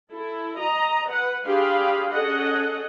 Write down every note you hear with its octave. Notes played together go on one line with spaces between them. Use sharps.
E4 A4
D#5 A#5
B4 F#5
D4 G4 G#4 F5 B5 C6
C#4 G#4 A4 D#5 F#5